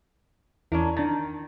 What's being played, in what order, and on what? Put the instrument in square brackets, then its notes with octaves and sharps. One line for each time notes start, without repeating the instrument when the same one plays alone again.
[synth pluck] E2 E4 [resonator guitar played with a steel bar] C#4 D4 A#4
[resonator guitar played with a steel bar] D#3 [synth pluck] D4 A5